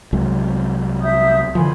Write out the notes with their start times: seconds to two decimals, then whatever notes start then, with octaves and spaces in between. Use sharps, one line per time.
0.13 C2 F#3 G#3
1.02 E5 D#6 G6
1.55 D3 E3 F3 G#5 B5 C6